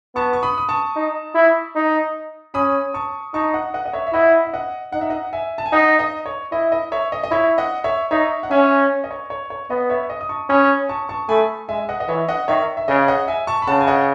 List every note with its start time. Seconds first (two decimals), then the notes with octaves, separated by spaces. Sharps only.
0.15 B3 A5 C#6
0.33 C#6
0.43 B5 D#6
0.58 D#6
0.69 A5 C#6
0.96 D#4
1.35 E4
1.75 D#4
2.54 C#4 B5 D#6
2.94 A5 C#6
3.34 D#4 A5 C#6
3.54 D#5 F#5
3.74 D#5 F#5
3.85 D#5
3.93 C#5 E5
4.07 E5
4.13 E4 D#5 F#5
4.45 E5
4.53 D#5 F#5
4.92 D#4 F#5
5.01 E5
5.10 D#5 F#5
5.33 E5 G#5
5.58 A5
5.66 G#5
5.72 D#4 D#5 F#5
5.99 D#5
6.26 C#5
6.52 E4 D#5
6.72 D#5
6.92 C#5 E5
7.12 D#5
7.24 D#5
7.31 E4 C#5 E5
7.58 D#5 F#5
7.84 C#5 E5
8.11 D#4 C#5 E5
8.43 F#5
8.51 C#4 E5 G#5
9.04 D#5
9.11 C#5
9.30 C#5
9.50 C#5
9.70 B3 D#5
9.90 C#5 E5
10.10 D#5
10.21 D#6
10.29 A5 C#6
10.50 C#4 B5 D#6
10.89 A5 C#6
11.09 A5 C#6
11.29 A3 G#5 B5
11.69 G#3 E5 G#5
11.89 D#5 F#5
12.00 D#5
12.08 E3 C#5 E5
12.28 D#5 F#5
12.48 D#3 C#5 E5
12.77 E5
12.88 C#3 D#5
13.08 D#5 F#5
13.28 E5 G#5
13.47 A5 C#6
13.62 B5
13.67 C#3 F#5 A5
13.81 G#5
13.87 D#5 F#5